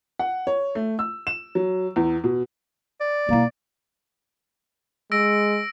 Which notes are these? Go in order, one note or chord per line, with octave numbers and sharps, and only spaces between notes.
F#5
C#5
A3
E6
E7
F#3
E2
B2
D5
B2 A#3 E4
G#3 E6 A#6 D7